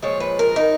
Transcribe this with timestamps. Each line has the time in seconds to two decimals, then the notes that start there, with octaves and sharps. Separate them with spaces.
0.02 A#2 F3 G#3 C#5
0.20 B4
0.39 A#4
0.56 D#4